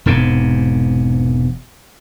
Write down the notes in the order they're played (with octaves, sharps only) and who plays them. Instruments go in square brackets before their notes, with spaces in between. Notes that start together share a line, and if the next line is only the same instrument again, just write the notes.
[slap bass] E1 G#2 C3